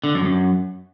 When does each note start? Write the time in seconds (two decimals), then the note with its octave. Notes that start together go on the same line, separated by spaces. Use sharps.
0.04 D3
0.14 F#2
0.25 F#2